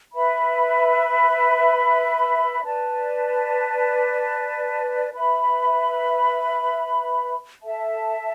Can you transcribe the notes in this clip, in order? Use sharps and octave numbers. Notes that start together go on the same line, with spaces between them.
B4 E5 B5
B4 D5 A5
B4 E5 B5
A4 E5 A5